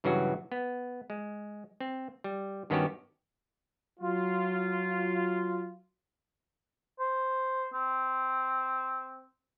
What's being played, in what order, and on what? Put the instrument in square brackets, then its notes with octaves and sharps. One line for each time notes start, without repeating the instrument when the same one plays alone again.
[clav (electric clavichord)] G2 C#3 E3 F#3 F#4
B3
G#3
C4
G3
G2 D#3 B3 C#4 F#4 G4
[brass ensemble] F#3 F4
[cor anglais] C5
C4